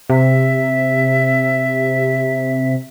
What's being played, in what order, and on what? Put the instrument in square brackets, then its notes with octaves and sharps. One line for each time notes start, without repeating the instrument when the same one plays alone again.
[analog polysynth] C3 [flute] E5